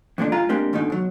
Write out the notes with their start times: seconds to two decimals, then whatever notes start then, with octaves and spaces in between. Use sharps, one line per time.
0.18 F2 A#2 D3 D4
0.32 G2 G#3 F4 A#5
0.49 G3 G#3 A#3 C4 D4
0.73 D#2 G#2 B2 D3 D#4
0.90 B2 F#3